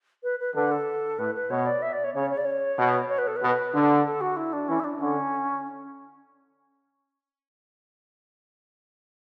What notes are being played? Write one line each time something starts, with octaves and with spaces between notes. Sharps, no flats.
B4
B4
D3 B4
A4
A2 B4
B4
B2 C#5
D5
E5
D5
C#5
C#3 C#5
C#5
D5
C#5
B2
C#5
B4
A4
B2 B4
D3
A4
F#4
E4
D4
E3 C#4
E4
D4
D3 C#4